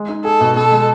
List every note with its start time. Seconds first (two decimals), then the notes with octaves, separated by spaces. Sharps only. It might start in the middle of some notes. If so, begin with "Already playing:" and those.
Already playing: G#3
0.09 D#4
0.24 G#4 A4
0.41 B2
0.56 B2 A4
0.72 G#3